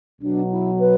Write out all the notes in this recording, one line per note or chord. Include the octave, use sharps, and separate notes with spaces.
B1 B2 F#3 D4
E4
B4